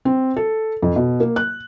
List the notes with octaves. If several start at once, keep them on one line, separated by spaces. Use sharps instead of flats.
C4
A4
F2
B2
A#3
F#6